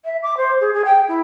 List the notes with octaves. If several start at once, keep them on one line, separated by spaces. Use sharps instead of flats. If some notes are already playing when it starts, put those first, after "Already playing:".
E5
D6
C5
G#4
G#4
G5
E4